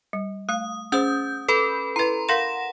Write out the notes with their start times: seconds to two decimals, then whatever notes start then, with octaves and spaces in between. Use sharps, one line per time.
0.13 G3
0.49 A3 F5 D#6
0.92 C#4 G#4 C5 D#6 G6
1.48 A4 B4 B5
1.96 E4 B4 A#5 C6
2.29 A#4 F5 F#5 C6 A#6 E7